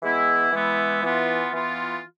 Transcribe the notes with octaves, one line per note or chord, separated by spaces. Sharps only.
E3 G#3 B3 E4
E3 G#3 B3 E4
E3 B3 F4
E3 B3 F4